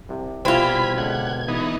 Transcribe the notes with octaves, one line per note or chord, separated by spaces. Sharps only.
C2 C3
C2 B2 E3 F3 C4 F4 B5 G#6
C#2 D3 F#5
E3 B3 D#4